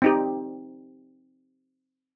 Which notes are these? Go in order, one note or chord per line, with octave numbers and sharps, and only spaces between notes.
C4 D#4 G4